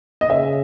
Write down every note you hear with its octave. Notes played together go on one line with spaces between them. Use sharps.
D#5
C#3 E5